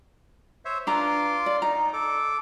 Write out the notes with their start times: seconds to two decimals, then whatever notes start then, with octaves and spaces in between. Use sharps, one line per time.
0.65 C5 C#5 E5
0.87 D4 F4 B4 A#5 C6 D6
1.46 D5
1.62 D#4 A#5
1.93 A4 D6